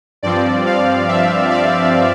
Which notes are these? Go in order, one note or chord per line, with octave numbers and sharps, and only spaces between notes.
G2 F3 C4 D5
F5
E5
D5